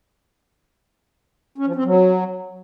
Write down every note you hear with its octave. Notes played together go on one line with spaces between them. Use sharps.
C#4
F3
C4
F#3